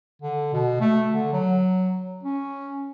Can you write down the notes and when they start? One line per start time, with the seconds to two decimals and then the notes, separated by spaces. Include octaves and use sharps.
0.22 D3
0.53 B2
0.80 A3
1.10 D3
1.33 F#3
2.23 C#4